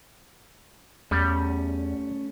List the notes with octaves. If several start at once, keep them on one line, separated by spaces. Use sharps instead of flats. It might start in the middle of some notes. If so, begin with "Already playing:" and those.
E2 G3 A3 C#4